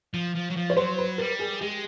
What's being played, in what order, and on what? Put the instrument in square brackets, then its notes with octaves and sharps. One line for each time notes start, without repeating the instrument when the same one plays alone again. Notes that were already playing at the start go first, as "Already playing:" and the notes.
[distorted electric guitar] F3
F3
F#3
F3
[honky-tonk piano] C#5
[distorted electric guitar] F#3 [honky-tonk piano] C5
[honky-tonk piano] B4
[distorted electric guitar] G3 [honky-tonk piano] A#4
[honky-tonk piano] G#4
[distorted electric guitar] G#3 [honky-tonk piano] G4